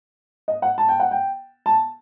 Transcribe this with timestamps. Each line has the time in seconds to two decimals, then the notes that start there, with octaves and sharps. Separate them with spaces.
0.48 D#5
0.62 F#5
0.78 A5
0.89 G5
1.00 F#5
1.11 G5
1.66 A5